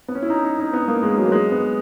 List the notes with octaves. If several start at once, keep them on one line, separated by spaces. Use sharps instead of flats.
B3
C#4
E4
D#4
D#4
D#4
B3
A#3
G#3
F#3
A#3
G#3
B3